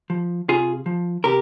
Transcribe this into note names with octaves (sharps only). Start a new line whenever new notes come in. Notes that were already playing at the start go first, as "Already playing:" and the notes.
F3
C3 F4 G#4
F3
C3 G4 A#4